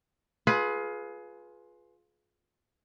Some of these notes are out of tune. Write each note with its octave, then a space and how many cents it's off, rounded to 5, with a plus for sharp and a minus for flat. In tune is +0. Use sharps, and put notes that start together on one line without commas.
F4 +15 G#4 +25 B4 +0